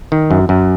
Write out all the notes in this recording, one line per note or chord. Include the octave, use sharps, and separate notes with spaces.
D#3
F#2
F#2